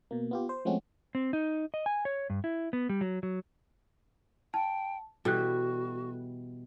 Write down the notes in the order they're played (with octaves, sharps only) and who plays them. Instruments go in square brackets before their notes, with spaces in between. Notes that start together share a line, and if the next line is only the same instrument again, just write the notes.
[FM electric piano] B2 A#3
B3 F4 G4
C5
F3 G#3 A3 C4 C#4 F#4
[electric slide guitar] C4
D#4
D#5
G#5
C#5
G2
E4
B3
G3
F#3
F#3
[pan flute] G5 [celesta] A5
[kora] B2 E3 G3 [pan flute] F#4 [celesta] A4 F#6